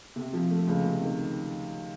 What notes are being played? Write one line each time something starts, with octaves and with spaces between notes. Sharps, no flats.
C3
F3
A3
C#2
C3
D#3